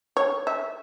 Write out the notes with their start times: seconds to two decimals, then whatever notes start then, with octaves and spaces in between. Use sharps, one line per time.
0.17 C#5
0.47 E5